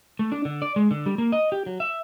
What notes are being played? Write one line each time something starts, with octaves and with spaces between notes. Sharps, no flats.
A3
D4
D3
D5
G#3
D3
G3
A#3
D#5
G4
F#3
E5